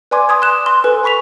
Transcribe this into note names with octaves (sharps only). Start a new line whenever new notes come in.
B4 D5 G#5 C6 D6 G#6
G#5 C6 D#6 G#6
C6 F#6 E7
C6
A4 B4 G#5
G#5 B5 C#6 B6 F7